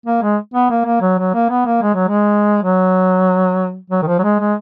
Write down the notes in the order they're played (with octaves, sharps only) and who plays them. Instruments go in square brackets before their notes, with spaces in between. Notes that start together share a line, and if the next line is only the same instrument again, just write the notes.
[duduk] A#3
G#3
B3
A#3
A#3
F#3
F#3
A#3
B3
A#3
G#3
F#3
G#3
F#3
F#3
D#3
F3
F#3
G#3
G#3